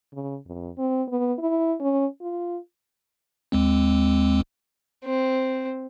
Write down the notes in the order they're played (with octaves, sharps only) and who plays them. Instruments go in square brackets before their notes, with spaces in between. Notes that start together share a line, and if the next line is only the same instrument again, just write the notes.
[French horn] C#3
F2
C4
B3
E4
C#4
F4
[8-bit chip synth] D#2 G#3 C4
[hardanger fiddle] C4